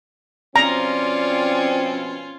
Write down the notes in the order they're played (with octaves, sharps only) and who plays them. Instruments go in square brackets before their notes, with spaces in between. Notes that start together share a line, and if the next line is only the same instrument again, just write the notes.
[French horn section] B2 F3 C4 [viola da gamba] C#4 F4 [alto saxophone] D5 [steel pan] A#5